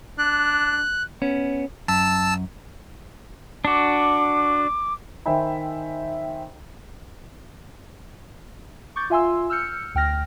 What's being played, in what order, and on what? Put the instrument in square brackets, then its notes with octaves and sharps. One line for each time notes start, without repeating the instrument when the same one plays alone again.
[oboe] D4 [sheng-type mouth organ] F#6
[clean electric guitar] B3 C#4
[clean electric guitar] F#2 [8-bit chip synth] A5 E6
[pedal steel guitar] D4 F#4 [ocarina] D6
[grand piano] D#3 C5 E5 G5 G#5 B5
[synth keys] C#6 D6 G6 A6
F4 E5 G#5 C6 E6
E6 F6 G6 C#7
D2 G5 F6 A#6